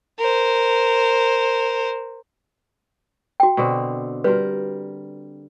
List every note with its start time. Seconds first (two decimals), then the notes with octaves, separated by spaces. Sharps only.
0.19 A#4 C5
3.40 F#4 G5
3.57 B2 D3 C4
4.24 G3 F#4 A#4 B4